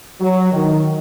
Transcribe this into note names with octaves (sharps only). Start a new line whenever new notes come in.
F#3
D#3